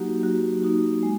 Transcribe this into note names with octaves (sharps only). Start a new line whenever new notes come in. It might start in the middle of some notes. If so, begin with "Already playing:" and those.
Already playing: F#3 A#3 D#4 F#4 G4
F#3 F#4
A#3 D#4 F#4
G#3